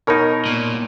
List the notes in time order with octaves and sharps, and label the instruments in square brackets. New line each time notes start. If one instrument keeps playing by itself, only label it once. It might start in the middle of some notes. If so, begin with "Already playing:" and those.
[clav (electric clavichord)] B2 D#4 [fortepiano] A#4 C#5
[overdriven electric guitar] A#2